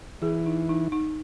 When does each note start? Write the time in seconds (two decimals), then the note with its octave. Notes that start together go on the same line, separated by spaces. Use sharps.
0.22 E3 G#4
0.46 D#4
0.69 D#4
0.92 D#4